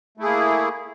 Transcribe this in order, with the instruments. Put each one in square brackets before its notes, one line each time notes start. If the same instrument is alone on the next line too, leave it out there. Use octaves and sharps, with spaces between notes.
[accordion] A3
E4
G#4
A#3